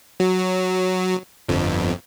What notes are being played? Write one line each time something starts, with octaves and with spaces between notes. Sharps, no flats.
F#3
G1 F2